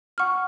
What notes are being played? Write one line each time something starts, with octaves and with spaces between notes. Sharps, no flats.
F#5 C#6 F6